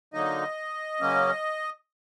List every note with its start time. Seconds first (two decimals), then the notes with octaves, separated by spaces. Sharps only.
0.13 D3 F#3 A#3 D#4 D#5
1.01 C#3 F#3 A#3 C#4